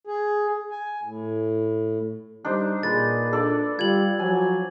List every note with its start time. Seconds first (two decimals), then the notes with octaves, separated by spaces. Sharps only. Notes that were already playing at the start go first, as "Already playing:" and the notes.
0.07 G#4
0.71 G#5
1.04 A2
2.45 G3 D4 D#4 C5
2.83 A#2 G#4 B4 A6
3.33 D4 A4 D5 D6
3.79 G3 F4 G#6 F#7
4.19 F3 F#3 G#5